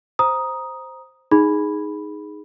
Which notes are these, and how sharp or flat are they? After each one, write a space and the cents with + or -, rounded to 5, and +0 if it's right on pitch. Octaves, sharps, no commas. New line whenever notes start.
C5 +0 A#5 +15 D#6 +0
D#4 +0 G#4 +0 B5 +0